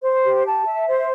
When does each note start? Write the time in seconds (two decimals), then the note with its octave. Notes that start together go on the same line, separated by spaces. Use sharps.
0.03 C5
0.24 G4
0.45 A5
0.66 E5
0.87 C5